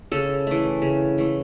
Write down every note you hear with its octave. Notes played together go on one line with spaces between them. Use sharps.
C#3 A4
E3 A3
C#3
E3 A3